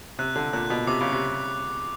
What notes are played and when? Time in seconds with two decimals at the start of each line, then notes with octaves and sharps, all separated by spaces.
0.19 C3 F#6
0.36 D3
0.53 A#2 F#6
0.70 B2
0.87 C3 D6
1.01 C#3
1.13 C3